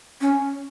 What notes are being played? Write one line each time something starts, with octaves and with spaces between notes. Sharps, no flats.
C#4